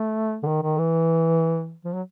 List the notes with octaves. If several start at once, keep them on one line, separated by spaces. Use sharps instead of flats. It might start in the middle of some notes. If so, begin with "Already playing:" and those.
Already playing: A3
D3
D#3
D#3
E3
F3
F#3